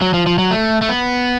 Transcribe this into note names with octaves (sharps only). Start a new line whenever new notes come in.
F#3
F3
F3
F#3
A3
A3
B3